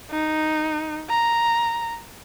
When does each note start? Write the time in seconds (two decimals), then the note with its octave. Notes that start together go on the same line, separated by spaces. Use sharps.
0.10 D#4
1.09 A#5